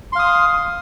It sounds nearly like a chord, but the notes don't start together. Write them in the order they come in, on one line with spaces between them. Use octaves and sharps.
C6 F5 D#6